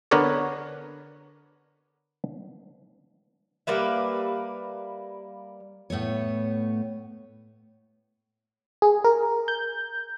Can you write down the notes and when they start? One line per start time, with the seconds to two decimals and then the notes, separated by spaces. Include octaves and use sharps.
0.11 D3 B3 A#4 B4 C#5 D5
3.67 G3 A#3 B4 E5
5.90 A2 A3 B3 C#5
8.82 G#4
9.04 A#4
9.48 G6